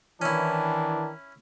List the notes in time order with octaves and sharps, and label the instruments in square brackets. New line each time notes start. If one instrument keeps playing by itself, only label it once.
[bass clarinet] D#3 [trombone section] E3 [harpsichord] C#4 E4 [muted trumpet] D4